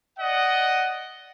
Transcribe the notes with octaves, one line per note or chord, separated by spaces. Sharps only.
D5 D#5 F#5